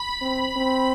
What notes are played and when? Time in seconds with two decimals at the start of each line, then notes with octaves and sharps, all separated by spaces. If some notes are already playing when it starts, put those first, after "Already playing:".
Already playing: B5
0.21 C4
0.56 C4